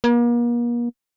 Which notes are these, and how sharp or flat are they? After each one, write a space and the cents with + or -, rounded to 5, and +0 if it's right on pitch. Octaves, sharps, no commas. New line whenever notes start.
A#3 +40